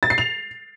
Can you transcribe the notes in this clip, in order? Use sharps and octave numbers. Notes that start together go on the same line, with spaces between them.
A6
C7
F7